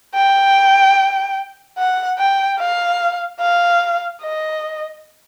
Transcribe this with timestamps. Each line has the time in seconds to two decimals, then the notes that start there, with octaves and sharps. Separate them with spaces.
0.15 G5
1.78 F#5
2.18 G5
2.59 F5
3.41 F5
4.22 D#5